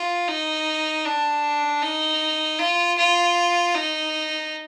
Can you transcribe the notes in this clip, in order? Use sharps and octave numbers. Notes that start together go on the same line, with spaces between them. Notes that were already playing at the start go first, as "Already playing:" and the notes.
Already playing: F4
D#4
D4
D#4
F4
F4
D#4